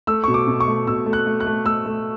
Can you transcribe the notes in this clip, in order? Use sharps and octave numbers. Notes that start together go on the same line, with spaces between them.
A3 E6
B2 C#6
D6
B2
C#6
A3
B2 E6
A3
F#6
A3
F#6
A3
A3 E6
A3